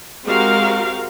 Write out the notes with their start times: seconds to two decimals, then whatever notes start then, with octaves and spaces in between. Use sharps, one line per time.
0.24 G#3 C4 F#4 G4 A#4 F5